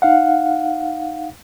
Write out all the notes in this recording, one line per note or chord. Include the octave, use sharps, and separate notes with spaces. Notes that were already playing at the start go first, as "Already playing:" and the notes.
D#4 F5 F#5